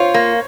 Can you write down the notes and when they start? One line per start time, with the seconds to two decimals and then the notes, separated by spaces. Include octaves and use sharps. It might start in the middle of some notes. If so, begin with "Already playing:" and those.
Already playing: F4 C5 C#5
0.14 A#3